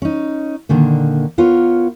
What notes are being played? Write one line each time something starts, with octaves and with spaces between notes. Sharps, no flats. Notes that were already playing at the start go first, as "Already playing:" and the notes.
C#4 D#4
A#2 D3 D#3 A#3
B3 F4 A#4 C#5